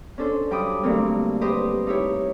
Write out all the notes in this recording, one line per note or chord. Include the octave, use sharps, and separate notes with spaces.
C#4 D4 A4 C5
G2 F#3 G5 B5 D6 D#6
G2 D3 F#3 A3 A#3 C4
G4 B4 C5 D#5 D#6
D#4 E4 G4 C#5